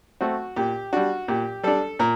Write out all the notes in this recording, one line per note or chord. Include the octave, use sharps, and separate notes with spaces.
A3 C4 F#4
A#2 G4
G3 D4 F#4
A#2 G4
G3 D4 A4
A#2 A#4